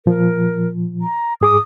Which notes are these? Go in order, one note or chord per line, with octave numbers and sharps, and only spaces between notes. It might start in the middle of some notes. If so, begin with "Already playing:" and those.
A#2 F3 A#4
A#5
G#2 G#4 D6 D#6